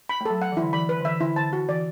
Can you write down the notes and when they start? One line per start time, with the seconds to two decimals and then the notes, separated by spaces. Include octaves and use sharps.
0.09 B5
0.21 A3
0.25 F#3 A4
0.42 F#5
0.52 E3
0.57 E4
0.62 D3
0.73 E3 B5
0.89 B4
1.00 D3
1.05 E3 E5
1.20 D3 E4
1.36 D3 A5
1.53 F#4
1.69 E3 D5